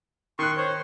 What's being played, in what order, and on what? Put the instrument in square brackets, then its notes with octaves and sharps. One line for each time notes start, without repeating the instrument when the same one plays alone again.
[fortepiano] D#3 F#6 [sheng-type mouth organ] C6 C#6
[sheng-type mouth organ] C5 C#5